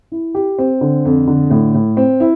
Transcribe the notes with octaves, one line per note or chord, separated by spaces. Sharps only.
E4
G4
C4
D3
F2
D3
A2
A2
C4
E4